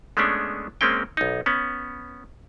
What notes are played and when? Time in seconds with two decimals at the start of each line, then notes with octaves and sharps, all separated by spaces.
0.17 G#3 A3 B3 C#4 D4
0.81 G#3 A#3 C4 C#4 G5
1.17 B1 D#4
1.46 B3 C#4